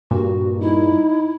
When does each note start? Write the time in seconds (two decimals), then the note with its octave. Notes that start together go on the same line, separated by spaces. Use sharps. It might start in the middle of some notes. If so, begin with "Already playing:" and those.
0.11 G2 A#2 F#4
0.61 D#4 E4